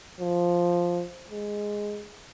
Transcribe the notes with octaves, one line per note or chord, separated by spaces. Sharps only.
F3
G#3